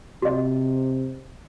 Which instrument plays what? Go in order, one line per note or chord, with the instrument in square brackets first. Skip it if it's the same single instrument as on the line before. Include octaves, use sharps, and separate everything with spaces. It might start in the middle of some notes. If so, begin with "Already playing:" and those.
[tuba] C3 [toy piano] F#4 D#5